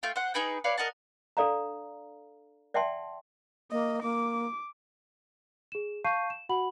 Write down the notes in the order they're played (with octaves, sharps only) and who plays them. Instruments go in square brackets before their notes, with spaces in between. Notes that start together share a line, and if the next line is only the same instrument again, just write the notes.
[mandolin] A3 F4 G5
C5 F#5
D#4 G#4 B4 G5
B4 C#5 D5 F5
A#4 D#5 F#5 A5
[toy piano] D4 A4 D5 F5 A#5
D5 E5 F#5 G5 A5 C6
[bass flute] A#3 [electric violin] D#5
[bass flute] A#3 [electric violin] D6
[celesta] G#4 E7
F5 A5 C#6 G6 C7 D#7
E7
F#4 F#5 B5 F#7